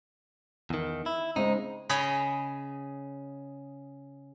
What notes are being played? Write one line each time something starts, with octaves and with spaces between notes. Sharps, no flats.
E2 D#3
E4
C#3 G#3 C4 D#4
C#3 G#4 C#5 D#5 B5